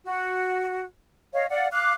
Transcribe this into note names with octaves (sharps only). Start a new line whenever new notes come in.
F#4
C#5 D#5 F5
D5 F5 F#5
F5 D6 F#6